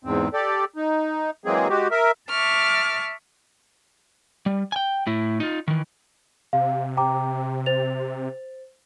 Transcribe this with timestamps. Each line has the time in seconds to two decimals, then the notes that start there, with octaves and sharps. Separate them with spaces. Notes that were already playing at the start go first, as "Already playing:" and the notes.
0.04 E2 G#2 C4
0.33 G4 A4 D5
0.76 D#4
1.45 E3 F#3 G#3 A#3 C4 G#4
1.69 G#3 F#4 G4
1.91 A#4 E5
2.29 E5 A5 C#6 D6 F6
4.46 G3
4.72 G5 G#5
5.07 A2 E4
5.40 D#4 F4
5.68 D#3 E3
6.53 C3 F5
6.97 G5 A#5 D6
7.66 C5 A6 F7